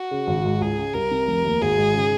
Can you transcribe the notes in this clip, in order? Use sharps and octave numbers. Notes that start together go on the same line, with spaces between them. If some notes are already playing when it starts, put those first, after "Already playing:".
Already playing: F#4
C#3
G#1
G#2
C#2 G#4
C#3
C2 A#4
C3
F1
D#2
G#1 G#4
G#2
C#3